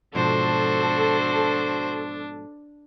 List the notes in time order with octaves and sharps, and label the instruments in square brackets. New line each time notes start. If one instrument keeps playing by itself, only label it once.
[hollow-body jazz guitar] G#2 B2 F3 [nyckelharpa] D4 [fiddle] F#4 C5 [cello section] A4